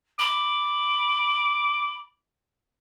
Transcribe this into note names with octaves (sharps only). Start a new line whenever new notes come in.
B5 D6